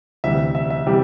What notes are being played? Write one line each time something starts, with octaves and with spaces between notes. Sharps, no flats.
D2 C3 E3 G3 E5
E5
E5
C3 E3 G3 G4